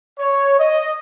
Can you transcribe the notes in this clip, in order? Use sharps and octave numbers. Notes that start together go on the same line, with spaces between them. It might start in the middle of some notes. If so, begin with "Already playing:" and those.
C#5
D#5